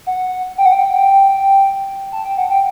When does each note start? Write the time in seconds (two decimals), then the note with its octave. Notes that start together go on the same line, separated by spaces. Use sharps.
0.07 F#5
0.58 G5
0.66 F#5
0.73 G5
2.12 A5
2.25 G5
2.37 F#5
2.50 G5